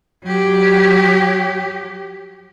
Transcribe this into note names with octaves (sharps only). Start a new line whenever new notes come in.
F#3 G4